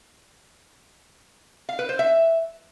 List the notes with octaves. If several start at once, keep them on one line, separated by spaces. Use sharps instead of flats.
F5
B4
C5
E5